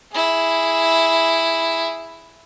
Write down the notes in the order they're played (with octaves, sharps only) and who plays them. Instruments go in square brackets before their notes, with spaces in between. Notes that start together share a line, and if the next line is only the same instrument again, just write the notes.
[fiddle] E4 G#4